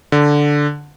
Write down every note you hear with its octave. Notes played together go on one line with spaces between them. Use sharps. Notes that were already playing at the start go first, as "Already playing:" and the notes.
D3